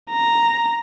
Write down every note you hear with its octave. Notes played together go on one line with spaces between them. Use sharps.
A#5